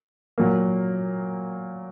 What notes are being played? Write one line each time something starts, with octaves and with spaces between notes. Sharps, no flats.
A#2 F#3 A#3